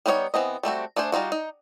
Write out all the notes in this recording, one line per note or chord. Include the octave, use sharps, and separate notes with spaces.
G3 B3 D#4 F#4 C#5
E3 B3 C4 D#5
G3 A3 C4 F#4
A3 D4 G#4 C5
G3 D#4 F4 F#4
D#4